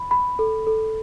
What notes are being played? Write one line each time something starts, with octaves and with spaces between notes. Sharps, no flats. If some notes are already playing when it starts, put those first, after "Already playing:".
Already playing: B5
B5
A4
A4